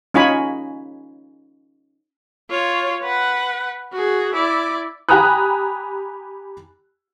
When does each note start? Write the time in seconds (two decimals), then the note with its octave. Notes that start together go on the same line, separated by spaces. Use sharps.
0.14 C#4 D#4 F4 C#5 G#5 B5
2.50 F4 C#5
3.03 B4 F#5
3.93 F#4 G#4
4.34 E4 D5
5.09 G4 G#5 A#5 B5 D#6 F#6